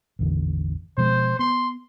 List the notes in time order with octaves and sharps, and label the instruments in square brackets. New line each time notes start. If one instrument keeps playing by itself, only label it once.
[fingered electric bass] A1 E2 D3
[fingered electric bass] B2 F3 G#3 [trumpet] C5
[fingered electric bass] B3 [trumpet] C6